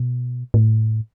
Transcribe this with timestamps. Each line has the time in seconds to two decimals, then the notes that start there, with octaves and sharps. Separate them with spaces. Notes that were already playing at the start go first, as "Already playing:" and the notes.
Already playing: B2
0.54 A2